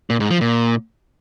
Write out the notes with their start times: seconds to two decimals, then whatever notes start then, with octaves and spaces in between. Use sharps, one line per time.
0.10 A#2
0.20 G#2
0.31 F3
0.41 A#2